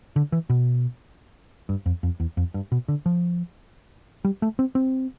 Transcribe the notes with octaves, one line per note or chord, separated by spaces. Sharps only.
D3
E3
B2
G2
F2
F2
E2
F2
G2
B2
D3
F3
G3
A3
C4
C4